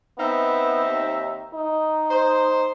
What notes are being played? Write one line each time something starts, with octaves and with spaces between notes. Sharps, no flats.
B3 C4 D#4 E5
D#2
D#4
C5